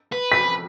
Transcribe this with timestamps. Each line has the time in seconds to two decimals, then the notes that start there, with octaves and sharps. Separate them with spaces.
0.12 B4
0.32 B6